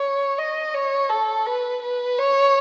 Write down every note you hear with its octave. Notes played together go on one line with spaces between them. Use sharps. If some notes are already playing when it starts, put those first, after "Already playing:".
Already playing: C#5
D#5
C#5
A4
B4
B4
C#5